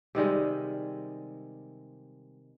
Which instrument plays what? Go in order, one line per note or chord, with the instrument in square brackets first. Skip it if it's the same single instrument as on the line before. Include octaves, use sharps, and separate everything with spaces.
[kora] C3 D#3 G3 G#3